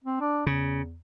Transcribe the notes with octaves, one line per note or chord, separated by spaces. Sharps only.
C4
D4
E2 C#3